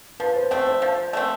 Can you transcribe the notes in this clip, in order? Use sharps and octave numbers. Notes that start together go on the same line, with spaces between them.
F3 B4
C5
A3 C4 C5
C5
F3
A3 C4